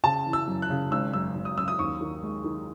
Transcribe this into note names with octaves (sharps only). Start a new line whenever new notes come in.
C#3 A5
E3
E6
F#2
F#6
C#3
G#1 E6
F#2 E6
G#1
D#6
F#2 E6
D#6
D#2 C#6
D#3
G#3
D#3